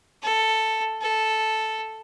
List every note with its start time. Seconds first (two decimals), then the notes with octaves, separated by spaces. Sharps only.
0.23 A4
1.02 A4